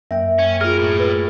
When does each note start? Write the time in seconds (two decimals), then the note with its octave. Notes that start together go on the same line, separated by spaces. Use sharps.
0.11 F#2 A#3 E5 G5
0.39 C#4
0.61 F4 G#4 A#4 F6
0.79 A2
0.99 B4